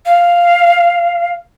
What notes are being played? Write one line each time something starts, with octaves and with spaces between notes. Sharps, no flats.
F5